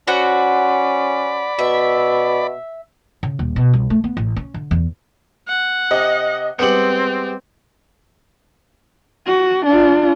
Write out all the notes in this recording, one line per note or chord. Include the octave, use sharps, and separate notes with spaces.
C#4 F#4 C5 D5 F#5 B5
B2 E5
C#3
D#1
B2
C2
A3
B3
A1
C#4
D3
E2
F#5
C3 D#5
G3 G#3 B3 C4 C#7 F#7
F#4
D4 F4